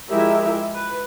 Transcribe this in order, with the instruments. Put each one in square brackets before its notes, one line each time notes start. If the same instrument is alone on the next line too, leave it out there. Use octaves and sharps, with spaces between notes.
[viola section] F3 G#3 E4 G4 A#4 E5
B4